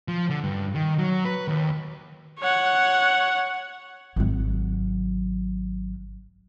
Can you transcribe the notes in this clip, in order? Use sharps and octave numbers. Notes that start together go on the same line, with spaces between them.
F3
D3
G2
D#3
F#3
B4
D#2
C#5 F#5
G#1 F#3